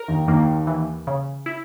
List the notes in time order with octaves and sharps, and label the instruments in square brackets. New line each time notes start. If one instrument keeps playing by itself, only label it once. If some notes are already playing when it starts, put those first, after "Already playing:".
Already playing: [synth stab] A#4
[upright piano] D#2 D#3
[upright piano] D#2 D#3 [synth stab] A#3
[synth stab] E3
C#3
E4